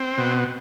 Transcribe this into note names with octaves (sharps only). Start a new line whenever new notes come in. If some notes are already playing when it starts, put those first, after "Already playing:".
Already playing: C4
B2